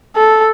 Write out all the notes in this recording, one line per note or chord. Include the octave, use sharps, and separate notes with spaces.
A4